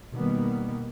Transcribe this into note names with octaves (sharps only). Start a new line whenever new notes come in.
B2 D#3 G3 A#3 B3